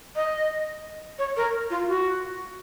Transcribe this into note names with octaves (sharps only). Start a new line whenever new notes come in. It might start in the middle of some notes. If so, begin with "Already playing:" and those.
D#5
C#5
A#4
F4
F#4